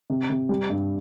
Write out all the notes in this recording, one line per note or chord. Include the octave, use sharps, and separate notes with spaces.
C3
C3
G3
G2